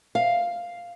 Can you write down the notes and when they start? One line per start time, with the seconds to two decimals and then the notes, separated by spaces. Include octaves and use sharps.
0.15 F5